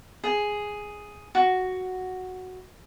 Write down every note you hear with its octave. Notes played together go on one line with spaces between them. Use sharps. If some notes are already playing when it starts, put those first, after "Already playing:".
G#4
F#4